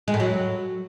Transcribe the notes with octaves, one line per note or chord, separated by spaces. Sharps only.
G#3
A2
F#3